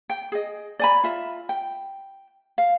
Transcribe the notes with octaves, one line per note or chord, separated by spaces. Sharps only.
G5
G#4 D#5
D5 G#5 B5
F4 E5
G5
F5